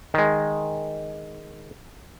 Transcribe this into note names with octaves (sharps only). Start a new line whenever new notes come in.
D#3 G#3